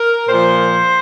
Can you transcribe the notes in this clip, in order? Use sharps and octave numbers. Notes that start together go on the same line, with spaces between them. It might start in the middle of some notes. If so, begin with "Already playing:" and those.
Already playing: A#4
A#2 F3 C5